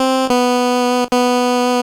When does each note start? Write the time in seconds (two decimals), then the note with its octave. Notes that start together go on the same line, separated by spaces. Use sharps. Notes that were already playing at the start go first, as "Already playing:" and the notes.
Already playing: C4
0.30 B3
1.11 B3